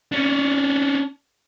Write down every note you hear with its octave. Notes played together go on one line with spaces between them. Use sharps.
C#4 D4